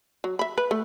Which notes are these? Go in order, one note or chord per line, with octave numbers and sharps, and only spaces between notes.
F#3
E5 B5
B4
A3